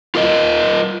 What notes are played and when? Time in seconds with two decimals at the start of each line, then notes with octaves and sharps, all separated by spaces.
0.15 F4 A#4 D#5